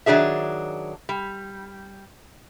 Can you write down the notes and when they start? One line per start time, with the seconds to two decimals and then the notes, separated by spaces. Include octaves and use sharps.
0.06 D#3 F#3 D4 G#4 E5
1.09 G3